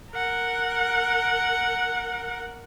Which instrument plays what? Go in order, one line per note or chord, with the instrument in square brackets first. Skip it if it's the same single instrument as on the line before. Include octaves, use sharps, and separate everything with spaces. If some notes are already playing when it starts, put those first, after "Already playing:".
[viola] A#4 F#5